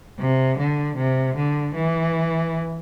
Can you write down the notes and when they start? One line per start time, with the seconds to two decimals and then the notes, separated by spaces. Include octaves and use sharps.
0.19 C3
0.58 D3
0.97 C3
1.36 D3
1.74 E3